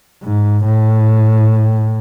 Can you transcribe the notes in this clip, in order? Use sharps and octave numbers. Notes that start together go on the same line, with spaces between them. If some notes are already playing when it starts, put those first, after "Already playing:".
G#2
A2